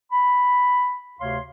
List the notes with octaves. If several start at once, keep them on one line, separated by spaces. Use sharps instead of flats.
B5
D2 C3 C#5 F5 C6